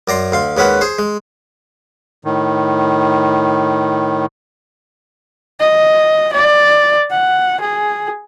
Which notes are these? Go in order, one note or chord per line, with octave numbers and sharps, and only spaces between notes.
F#2 D5 A#5 C6
D2 F5 C6
D#2 G#3 C#4 B4 F#5
G#4 C5
G#3
A2 D#3
D#5
D5
F#5
G#4